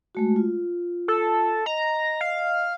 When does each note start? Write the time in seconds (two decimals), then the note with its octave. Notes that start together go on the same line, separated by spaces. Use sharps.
0.15 G#3 A3 F#4
0.36 F4
1.08 A4
1.66 D#5 A#5
2.21 F5